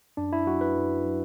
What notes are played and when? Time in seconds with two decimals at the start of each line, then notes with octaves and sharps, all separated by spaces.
0.17 F#2 D4
0.33 E4
0.47 F#3 F#4
0.61 B4
0.76 F#2
1.05 F#3